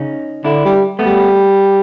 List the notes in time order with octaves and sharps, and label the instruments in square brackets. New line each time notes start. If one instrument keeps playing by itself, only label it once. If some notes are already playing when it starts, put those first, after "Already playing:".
Already playing: [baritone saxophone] C#3 [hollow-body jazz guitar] C#4 D#4
[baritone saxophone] D3 [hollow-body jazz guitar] D4 E4
[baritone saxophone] G3
[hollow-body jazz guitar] A3 B3
[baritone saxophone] G3